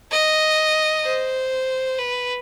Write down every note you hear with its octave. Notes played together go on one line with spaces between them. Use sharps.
D#5
C5
B4